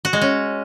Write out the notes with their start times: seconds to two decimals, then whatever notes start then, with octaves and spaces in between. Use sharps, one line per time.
0.05 F#4
0.13 G#3
0.22 C#4